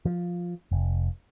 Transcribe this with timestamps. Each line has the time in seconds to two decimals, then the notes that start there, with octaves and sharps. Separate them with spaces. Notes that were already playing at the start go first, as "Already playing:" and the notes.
0.05 F3
0.72 F1